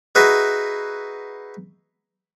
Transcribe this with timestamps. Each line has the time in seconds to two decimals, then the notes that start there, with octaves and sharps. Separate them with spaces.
0.15 D#4 F#4 G#4 B4 E5